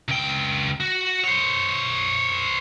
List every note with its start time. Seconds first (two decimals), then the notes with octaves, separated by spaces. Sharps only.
0.08 C#2 G5
0.80 F#4
1.24 C5 C#5